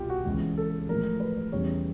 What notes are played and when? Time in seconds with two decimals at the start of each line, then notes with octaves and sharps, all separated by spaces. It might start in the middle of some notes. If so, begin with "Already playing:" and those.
Already playing: C2 B2 G3 F4 G4
0.10 F#4
0.25 C#2 C#3 E3 G#3
0.57 A4
0.89 A2 F3 G#3 A#4
1.20 B4
1.52 E2 C#3 E3 G3 C#5